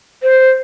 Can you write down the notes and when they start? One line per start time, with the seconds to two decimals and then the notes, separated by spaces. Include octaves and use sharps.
0.23 C5